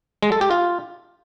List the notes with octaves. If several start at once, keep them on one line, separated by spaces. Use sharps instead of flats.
G#3
A4
G4
F4